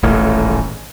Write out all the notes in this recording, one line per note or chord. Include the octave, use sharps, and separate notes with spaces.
D#1 A1 G#2 A3